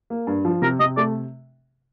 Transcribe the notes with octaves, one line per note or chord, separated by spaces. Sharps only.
A#3
G2
F3
C3 A#4
C3 D#5
A3 D5